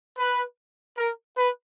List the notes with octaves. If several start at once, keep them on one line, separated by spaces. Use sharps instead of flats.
B4
A#4
B4